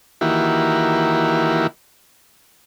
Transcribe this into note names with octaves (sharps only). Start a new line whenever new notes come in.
D#3 E3 A#3 E4 F#4 G4